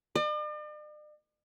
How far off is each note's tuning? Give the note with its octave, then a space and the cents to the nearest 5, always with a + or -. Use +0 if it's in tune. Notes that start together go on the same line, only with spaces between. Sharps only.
D5 +45